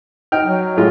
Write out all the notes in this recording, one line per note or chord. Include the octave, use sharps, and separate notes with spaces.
D#4 G5 F6
F#3
A2 G#3 F4